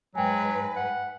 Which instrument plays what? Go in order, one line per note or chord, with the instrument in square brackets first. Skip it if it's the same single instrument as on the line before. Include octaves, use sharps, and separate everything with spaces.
[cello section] G#2 G#3 B4 [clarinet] F#3 [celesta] G5 G#5
[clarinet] F#5